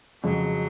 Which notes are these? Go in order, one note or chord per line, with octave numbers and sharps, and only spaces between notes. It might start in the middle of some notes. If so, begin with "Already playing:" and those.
F2 C#3 F#3 G#3